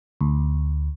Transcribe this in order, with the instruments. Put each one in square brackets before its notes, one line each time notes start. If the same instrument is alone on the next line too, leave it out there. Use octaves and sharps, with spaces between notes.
[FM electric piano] D2